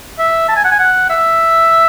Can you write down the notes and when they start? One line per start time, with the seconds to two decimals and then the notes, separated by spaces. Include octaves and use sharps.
0.19 E5
0.48 A5
0.56 G#5
0.64 F#5
0.71 G#5
0.79 F#5
1.10 E5